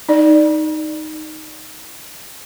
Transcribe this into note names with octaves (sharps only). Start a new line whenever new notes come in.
D#4 D5